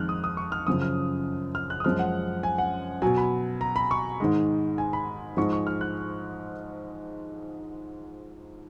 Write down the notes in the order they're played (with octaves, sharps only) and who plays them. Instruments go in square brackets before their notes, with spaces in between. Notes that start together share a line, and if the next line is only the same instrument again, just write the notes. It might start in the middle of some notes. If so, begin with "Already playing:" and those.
Already playing: [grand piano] F2 D#3 G#3 F6 F#6
D#6
D#6
C#6
F6
F#2 C#3 F3 D#6
F6
F6
F#6
D#6
F#2 F3 G#3 F6
F#5
G#5
F#5
B2 F#3 G#5
B5
A#5
B5
C#6
G#2 D#3 G#3
G#5
B5
G#2 F3 G#3 C#6
C#6
F6
F#6